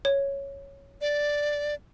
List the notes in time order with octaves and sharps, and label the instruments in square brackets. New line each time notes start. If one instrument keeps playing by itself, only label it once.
[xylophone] C#5
[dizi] D5